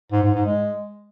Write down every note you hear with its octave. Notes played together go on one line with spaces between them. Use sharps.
G#2
G#2
G#2
G#3